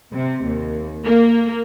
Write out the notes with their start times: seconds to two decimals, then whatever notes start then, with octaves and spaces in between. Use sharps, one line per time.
0.13 C3
0.45 D#2
1.05 A#3